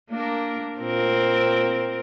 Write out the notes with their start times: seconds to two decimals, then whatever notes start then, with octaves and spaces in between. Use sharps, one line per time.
0.10 A#3 D4 A#4
0.79 A#2 C4 A#4